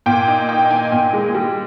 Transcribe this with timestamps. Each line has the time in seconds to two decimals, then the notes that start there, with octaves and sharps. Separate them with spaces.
0.06 A#2 G5
0.27 D#4
0.49 D#4 G5
0.70 D#4 G#5
0.92 A#2
1.13 G#3
1.35 G3